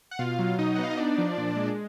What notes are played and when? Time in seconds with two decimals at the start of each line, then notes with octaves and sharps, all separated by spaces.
0.11 F#5
0.19 B2 F4 F5
0.39 F#3
0.58 B2 D#4 D#5
0.75 F#5
0.78 B3 F5
0.90 D#5
0.97 D4 D#4 D5
1.18 F3
1.38 A#2
1.56 G#3